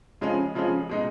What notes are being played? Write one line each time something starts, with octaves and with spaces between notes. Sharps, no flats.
C#3 F3 G#3 C#4
C#3 F3 G#3 C#4
B2 G#3 D#4